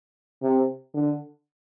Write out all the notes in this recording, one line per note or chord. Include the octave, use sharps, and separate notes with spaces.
C3
D3